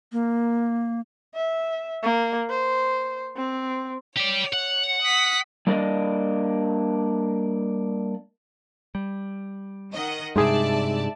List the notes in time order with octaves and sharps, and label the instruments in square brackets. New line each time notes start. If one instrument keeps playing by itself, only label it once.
[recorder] A#3
[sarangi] E5
A#3
C5
C4
[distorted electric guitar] G4 D5 [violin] C#5
[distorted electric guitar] F#5
[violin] D#6 B6
[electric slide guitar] G3 A#3 D4 D5 D#5
[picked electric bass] G3
[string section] D#3 D#5 F#5
[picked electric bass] G2 C3 [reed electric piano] G#3 D#4 G#4 [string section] D5 E5 A5